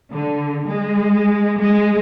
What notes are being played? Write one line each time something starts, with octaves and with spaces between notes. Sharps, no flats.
D3
G#3
G#3